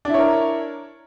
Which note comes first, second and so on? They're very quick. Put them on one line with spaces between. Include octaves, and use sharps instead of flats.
D4 E4 C#5 A#4